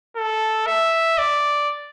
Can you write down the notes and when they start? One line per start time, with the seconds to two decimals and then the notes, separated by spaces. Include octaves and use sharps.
0.17 A4
0.67 E5
1.18 D5